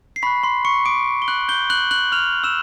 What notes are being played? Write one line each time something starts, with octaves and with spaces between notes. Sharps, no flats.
C7
B5 C#6 F#6 B6
C6 C7
C#6 C#7
D6 D7
G7
F#6 F#7
G6 G7
F#6 F#7
F#6 F#7
F6 F7
E6 E7